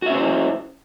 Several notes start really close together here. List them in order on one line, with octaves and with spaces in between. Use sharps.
F#4 E5 C#4 C5 E4